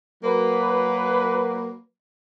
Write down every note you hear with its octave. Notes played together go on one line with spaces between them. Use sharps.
F#3 A#3 B4